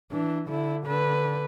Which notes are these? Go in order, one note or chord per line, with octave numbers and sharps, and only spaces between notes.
E3 D4
D3 E4
D3 B4